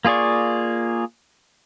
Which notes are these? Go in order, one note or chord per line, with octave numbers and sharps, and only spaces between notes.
A#3 F4 G#4 D5 C#6